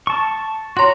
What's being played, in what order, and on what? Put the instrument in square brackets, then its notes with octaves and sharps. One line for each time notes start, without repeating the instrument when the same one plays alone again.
[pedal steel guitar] A5 C#6
[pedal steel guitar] F#4 A#5 [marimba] C#5 C6